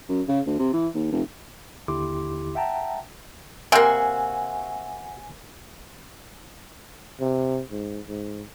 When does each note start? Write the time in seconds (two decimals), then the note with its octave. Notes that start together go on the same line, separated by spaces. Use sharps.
0.09 F#2
0.28 C#3
0.46 D2
0.59 C3
0.73 E3
0.95 D#2
1.12 F1
1.88 D#2 D3 E4 G4 C6 D6
2.55 E5 F#5 G5 A5 A#5
3.72 C3 A#3 F#4 E5 G#5 C6
7.20 C3
7.71 G#2
8.08 G#2